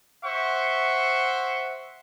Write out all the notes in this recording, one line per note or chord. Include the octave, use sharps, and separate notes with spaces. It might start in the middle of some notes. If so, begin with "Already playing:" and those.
C5 E5 F#5 C#6